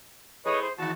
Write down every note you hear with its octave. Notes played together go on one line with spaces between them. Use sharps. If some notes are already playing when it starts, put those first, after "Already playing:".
A3 E4 G#4 B4 C#5 D#5
C5
E2 D#3 F#4 A5